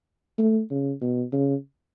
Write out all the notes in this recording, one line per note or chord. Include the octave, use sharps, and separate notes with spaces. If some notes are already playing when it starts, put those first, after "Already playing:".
A3
C#3
B2
C#3